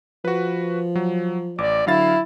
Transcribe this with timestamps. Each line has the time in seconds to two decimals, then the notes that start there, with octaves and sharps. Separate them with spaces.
0.25 F3 F#4 B4
0.96 F#3
1.58 A1 D5 D6
1.87 D3 F#3 E4 F5 A6